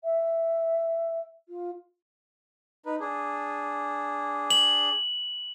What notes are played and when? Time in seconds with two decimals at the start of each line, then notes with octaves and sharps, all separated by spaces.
0.04 E5
1.49 F4
2.86 D#4 B4
3.00 D4 G#4
4.50 F#7